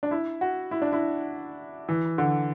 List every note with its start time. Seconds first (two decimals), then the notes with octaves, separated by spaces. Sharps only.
0.03 D4
0.11 E4
0.41 F#4
0.71 E4
0.82 D4
0.92 E4
1.89 E3
2.18 D3